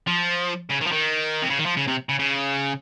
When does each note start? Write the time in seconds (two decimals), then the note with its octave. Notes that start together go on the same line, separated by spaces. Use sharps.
0.07 F3
0.70 C#3
0.82 D#3
0.87 F3
0.92 D#3
1.42 C3
1.50 C#3
1.58 D#3
1.66 F3
1.77 C#3
1.88 C3
2.09 C#3
2.19 C#3